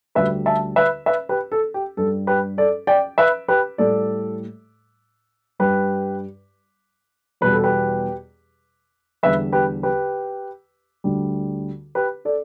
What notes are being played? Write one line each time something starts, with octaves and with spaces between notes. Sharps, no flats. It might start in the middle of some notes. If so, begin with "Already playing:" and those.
D2 D3 G3 B4 E5
E5 A5
B4 E5
B4 E5
G4 B4
A4
G4
G2 G3 A4
G4 B4
A4 D5
D5 G5
B4 E5
G4 B4
A2 G3 A4 D5
G2 G3 G4 B4
E2 B2 G3 B4
A4
G4 B4
E2 D3 G3 B4 E5
G4 B4
G4 B4
D2 D3 G3
G4 B4
A4 D5